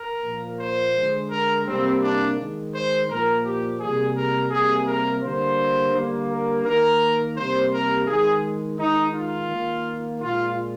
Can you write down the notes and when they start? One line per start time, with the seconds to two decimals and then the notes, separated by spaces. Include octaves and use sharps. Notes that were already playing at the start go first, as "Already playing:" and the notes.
Already playing: A#4
0.23 A#2 F3 A#3
0.58 C5
0.94 D3 G#3
1.30 A#4
1.66 C3 G3 A#3 C4
2.01 D4
2.36 D#3 G#3
2.72 C5
3.08 A#2 F3 A#3 A#4
3.44 G4
3.79 C3 G3 A#3 G#4
4.15 A#4
4.50 C3 G3 A#3 G#4
4.86 A#4
5.22 D3 G3 A#3 C5
5.93 D3 G3 A#3
6.29 A#4
6.64 D#3 A#3 A#4
7.36 C3 G3 A#3 C5
7.72 A#4
8.07 D#3 G#3 G#4
8.78 D#3 G#3 D#4
9.14 F4
9.50 D#3 A#3
10.21 A#2 G#3 F4